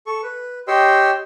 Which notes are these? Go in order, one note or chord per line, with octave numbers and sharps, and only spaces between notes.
A4 C#6
B4
G4 C#5 D#5 G5 C6 E6